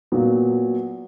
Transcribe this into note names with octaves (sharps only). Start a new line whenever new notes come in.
A#2 F#3 B3